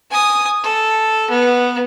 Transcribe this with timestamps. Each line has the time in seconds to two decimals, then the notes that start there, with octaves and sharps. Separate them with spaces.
0.11 G#5 D#6
0.64 A4
1.30 B3